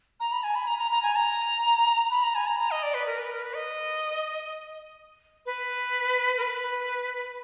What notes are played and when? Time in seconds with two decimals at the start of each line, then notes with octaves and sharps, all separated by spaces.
0.20 A#5
0.32 B5
0.43 G#5
0.55 B5
0.67 A#5
0.79 A#5
0.91 A#5
1.03 G#5
1.16 A#5
2.11 B5
2.23 A#5
2.35 G#5
2.47 A#5
2.59 A#5
2.71 D#5
2.83 D5
2.94 B4
3.06 A#4
3.19 B4
3.31 A#4
3.42 B4
3.55 D#5
5.46 B4
6.37 A#4
6.42 B4